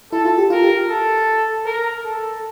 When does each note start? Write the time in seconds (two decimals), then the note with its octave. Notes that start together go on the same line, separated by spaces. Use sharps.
0.12 E4 A4
0.25 F4
0.38 G4
0.50 F4 A#4
0.62 G4
0.89 A4
1.66 A#4
2.04 A4